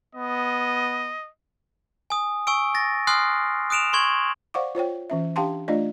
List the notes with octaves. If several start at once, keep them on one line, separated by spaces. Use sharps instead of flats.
B3 D#5
G#5 D#6
G#5 C#6 E6 D7
A6 A#6
G#5 C6 D#6 F6 F#6 C7
D#6 F#6 D7 E7 F7
C6 C#6 G#6 F#7
C5 D5 F5 F#5 C#6 D6
F4 C5 C#5 G5
E3 C#4 E5
D4 G4 F5 G5 A5 C6
A3 D4 F4 D5 D#5